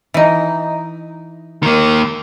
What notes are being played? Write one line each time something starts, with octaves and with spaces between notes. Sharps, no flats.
E3 D#4
D#3 A#3